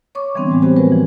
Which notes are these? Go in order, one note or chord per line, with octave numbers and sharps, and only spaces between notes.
C#5 C#6 D6
D3 E3 G3 B3 C4 D4
A2 G3 G#3
B3 C4 F#4 G4 C5
F3 G#3 A#4 B4
E3